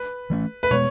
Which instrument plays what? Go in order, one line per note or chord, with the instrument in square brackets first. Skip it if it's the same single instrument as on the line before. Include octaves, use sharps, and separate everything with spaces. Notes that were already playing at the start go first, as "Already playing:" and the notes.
Already playing: [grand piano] B4
[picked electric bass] E3 A3 C#4
[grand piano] B4
[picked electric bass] B2 G#3 B3 [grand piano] C#5